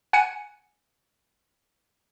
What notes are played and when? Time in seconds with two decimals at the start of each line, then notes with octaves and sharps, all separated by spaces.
0.13 F#5 G#5 C#7 D#7